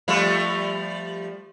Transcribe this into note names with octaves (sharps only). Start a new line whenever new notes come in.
F3 G3 A3